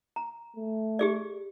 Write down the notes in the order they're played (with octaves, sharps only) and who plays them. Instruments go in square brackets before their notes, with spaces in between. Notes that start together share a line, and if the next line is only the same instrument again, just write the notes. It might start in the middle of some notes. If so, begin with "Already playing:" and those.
[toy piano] A#5
[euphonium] A3
[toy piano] G4 G#4 D5